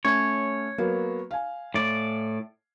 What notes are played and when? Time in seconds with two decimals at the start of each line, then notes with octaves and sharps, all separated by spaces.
0.05 A3 C#4 C#5
0.78 F#3 A#3 B3
1.31 F5 G#5
1.74 A2 D5